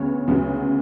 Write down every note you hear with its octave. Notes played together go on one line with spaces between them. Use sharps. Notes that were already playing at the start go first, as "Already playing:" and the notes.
Already playing: D2 C#3 B3 C#5
D2 C#3 F#3 B3